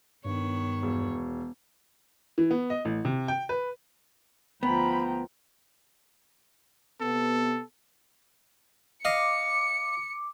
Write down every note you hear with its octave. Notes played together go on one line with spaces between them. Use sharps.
G2 D#3 B3 C#5
E1
E3
B3
D#5
A1
C3
G5
B4
D2 F3 B3 G5 A#5 B5
C3 B3 A4
D#5 F5 D6 C#7